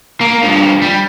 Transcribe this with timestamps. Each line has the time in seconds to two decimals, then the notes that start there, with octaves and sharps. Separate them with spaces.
0.21 A#3
0.43 G2 F3
0.82 G3